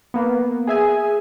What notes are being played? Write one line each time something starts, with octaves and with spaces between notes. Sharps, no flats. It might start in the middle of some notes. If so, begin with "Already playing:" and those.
A#3 B3
G#4 E5 G#5